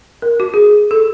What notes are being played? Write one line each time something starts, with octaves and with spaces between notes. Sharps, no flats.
A#4
F#4
G#4
A4